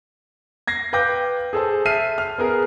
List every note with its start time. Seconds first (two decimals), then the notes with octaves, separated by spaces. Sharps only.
0.68 G#6 A#6 C7
0.93 B4 F5 G5 D6 G6 A#6
1.53 G#4 A4 C5 A5
1.85 E5 A5 F6 C7 D#7
2.18 F6
2.38 B3 G#4 A#4 B4